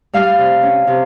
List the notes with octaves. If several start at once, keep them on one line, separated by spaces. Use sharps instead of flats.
G3 F5
C3
C#4
C3